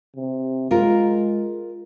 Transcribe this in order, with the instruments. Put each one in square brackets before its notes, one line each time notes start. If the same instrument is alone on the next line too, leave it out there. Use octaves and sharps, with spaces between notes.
[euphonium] C3
[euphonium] G#3 [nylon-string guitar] F4 A#4